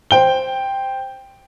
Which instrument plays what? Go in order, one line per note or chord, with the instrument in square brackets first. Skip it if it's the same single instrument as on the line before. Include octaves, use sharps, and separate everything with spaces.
[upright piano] C5 G5 G7